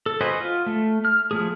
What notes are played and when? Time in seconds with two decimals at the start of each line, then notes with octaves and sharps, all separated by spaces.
0.06 A4
0.21 F#4 B4 C5 D#5 G#5
0.40 F4
0.66 A3
1.05 F6
1.31 F3 A3 G#4